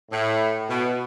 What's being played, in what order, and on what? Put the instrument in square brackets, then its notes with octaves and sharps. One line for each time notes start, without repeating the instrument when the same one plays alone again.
[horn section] A2
B2